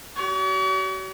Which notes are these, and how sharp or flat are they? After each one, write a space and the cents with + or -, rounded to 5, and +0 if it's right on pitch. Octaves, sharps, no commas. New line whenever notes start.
F#4 +45 C#5 +45